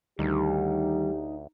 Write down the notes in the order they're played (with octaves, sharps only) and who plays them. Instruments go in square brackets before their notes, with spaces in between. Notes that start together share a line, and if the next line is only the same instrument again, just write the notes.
[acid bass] D2 [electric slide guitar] D#3 G3 [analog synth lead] D#4 [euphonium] G4